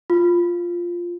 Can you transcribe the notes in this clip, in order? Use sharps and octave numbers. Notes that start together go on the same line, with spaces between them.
F4